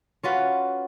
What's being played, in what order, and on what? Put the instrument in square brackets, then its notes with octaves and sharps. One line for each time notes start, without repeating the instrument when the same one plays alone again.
[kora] C#4 F4 F#4 B4